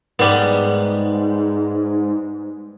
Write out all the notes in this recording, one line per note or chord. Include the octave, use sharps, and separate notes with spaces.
G#2 G3 B3